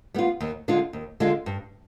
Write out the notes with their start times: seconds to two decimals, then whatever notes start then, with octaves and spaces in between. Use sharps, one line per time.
0.14 G3 B3 F4
0.40 D#2
0.68 D3 G#3 D4 F4
0.93 D#2
1.20 D3 G#3 D4 F4
1.46 G2